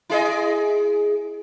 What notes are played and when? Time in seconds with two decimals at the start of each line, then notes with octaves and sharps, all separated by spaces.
0.10 E4 G#4 D#5